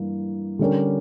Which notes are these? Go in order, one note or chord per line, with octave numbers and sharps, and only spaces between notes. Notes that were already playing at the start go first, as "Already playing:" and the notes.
Already playing: G2 E3 A#3
D3 G3 C#4 G4 A#4